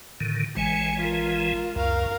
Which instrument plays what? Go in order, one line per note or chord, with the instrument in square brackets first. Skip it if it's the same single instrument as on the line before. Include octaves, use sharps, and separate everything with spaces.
[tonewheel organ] A2 D3 D#3
[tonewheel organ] A1 E3 G#3 [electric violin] G#5 C#7
[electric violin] F4 A#4
[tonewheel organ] C#2 F#2 [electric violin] A#4 F5